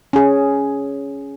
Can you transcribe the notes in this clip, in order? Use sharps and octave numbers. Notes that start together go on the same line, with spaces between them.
C#4 G#4